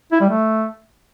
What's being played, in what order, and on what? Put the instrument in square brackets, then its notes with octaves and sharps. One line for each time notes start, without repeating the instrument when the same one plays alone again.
[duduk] E4
G3
A3